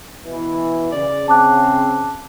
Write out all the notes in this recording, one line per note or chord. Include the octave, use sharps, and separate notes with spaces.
B2 E3
C#3 D5
C4 A5 D6 F#6